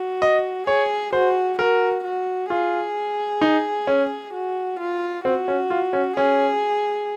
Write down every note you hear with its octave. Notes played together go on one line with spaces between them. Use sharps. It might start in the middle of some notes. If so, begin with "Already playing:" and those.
Already playing: F#4
D#5
G#4 C#5
F#4 C5
F#4 A#4
F#4
F4 G#4
D#4
C#4
F#4
F4
C4 F#4
C#4
F4
C#4
C#4 G#4